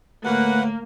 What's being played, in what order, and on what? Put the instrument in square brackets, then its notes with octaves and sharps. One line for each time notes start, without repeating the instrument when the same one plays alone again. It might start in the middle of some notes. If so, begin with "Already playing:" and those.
[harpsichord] D2 A2 [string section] A#3 [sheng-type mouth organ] B4 F#5